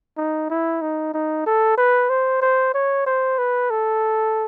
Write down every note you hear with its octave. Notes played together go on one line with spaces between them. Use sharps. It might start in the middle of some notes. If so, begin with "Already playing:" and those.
D#4
E4
D#4
D#4
A4
B4
C5
C5
C#5
C5
B4
A4